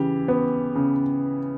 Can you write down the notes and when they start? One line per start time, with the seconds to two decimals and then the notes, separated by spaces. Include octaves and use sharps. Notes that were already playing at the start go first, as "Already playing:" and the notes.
Already playing: C#3 E3 G4
0.28 B3
0.75 C#3